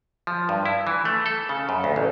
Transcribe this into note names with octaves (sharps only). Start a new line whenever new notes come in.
F3
G2
E4
E3
A3
A4
C#3
F#2
D2
A1